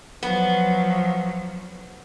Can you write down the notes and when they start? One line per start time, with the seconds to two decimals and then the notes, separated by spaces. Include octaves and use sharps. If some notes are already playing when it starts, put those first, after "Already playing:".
0.23 F3 F#3 B3